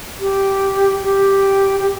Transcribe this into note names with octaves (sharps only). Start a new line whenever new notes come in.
G4
G4
G4